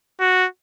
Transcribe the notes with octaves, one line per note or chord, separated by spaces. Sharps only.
F#4